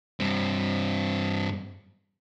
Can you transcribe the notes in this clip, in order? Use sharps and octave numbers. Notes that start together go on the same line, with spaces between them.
G2 C4